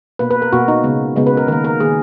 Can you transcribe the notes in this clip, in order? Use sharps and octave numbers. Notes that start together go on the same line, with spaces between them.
B2 A#3 B4
B4
A#4
B2 A#3 F#4
D#4
C#3 G#3 B3
C#3 G#3 B3
B4
A#4
D#3 A#3 A#4
A#4
D#3 A#3 G#4